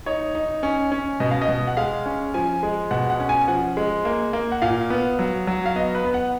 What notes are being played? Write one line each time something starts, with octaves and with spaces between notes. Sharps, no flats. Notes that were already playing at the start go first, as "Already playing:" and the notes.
D#4 C#5
D#4
C#4
C#4
B2 D#5
F5
D#5
B2
F#5
G#3 F5
C#4
F3 G#5
G#3
B2 F#5
F#5
C#4
G#5
F3 F#5
G#3
A#3
A#3
F#5
A#2 F5
B3
F#3
F#3
F5
B3 D#5
B4
B3
F#5